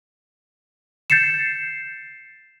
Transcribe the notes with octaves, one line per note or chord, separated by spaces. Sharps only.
G6 A6 C7 C#7 E7